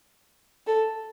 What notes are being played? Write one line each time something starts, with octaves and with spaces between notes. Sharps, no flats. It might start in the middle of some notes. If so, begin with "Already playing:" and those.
A4